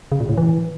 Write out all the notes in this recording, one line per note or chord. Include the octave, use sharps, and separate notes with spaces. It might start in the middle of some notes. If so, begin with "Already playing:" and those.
C#3
A#2
A2
E3